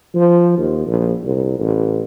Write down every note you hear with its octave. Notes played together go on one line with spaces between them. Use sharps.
F3
D#2
A#1
C2
A1